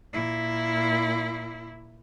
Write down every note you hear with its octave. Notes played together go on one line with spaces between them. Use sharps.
A#2 E4